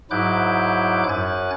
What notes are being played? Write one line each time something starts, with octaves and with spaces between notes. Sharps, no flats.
G#2 F#3 E4 D6 F#6 G6
F#2 G#5 F#6 A6